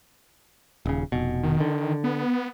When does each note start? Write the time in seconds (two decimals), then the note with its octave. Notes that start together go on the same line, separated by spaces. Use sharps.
0.86 D#1 C#3
1.12 F1 B2
1.43 D#3
1.60 D3
2.04 B3